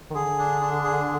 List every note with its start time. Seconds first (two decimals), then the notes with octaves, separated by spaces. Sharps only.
0.10 D#3
0.14 D3 G#4
0.38 D4
0.61 D4
0.84 G#4